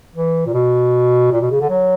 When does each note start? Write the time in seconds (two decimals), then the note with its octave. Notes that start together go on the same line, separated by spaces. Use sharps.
0.15 E3
0.46 A#2
0.54 B2
1.32 A#2
1.42 B2
1.51 C#3
1.61 D3
1.70 F#3